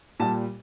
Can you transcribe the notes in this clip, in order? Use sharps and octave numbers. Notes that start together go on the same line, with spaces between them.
A#2 G3 A5